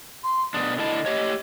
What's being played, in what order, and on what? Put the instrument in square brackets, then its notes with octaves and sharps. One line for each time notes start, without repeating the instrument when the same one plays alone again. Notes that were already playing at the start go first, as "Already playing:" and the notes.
[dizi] C6
[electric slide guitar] B2 D4 [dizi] D#6
[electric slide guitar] D3 E4 A5 [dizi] D#5
[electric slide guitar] G4 C#5